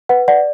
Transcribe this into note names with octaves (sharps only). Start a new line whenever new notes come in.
B4 F#5
D5 F#5